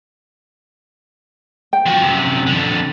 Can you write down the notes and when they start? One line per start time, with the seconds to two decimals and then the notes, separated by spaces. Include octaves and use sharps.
1.73 G5
1.86 F3 F#4
2.02 F#2 C3
2.47 F2 D3